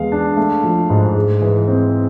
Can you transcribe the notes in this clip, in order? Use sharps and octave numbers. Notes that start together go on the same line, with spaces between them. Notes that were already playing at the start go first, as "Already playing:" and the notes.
Already playing: E2 G#3 B3 F5
D4
A3
F3
G#2
G#3
E3
C4